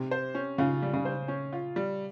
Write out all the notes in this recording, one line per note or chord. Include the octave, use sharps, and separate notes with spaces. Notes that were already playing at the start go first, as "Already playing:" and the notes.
Already playing: C3
C5
C#4
C#3 F4
G3
C#3
C5
C#4
F4
G3